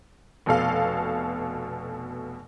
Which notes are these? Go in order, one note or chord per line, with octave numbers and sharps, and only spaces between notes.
F1 B2 A4 F5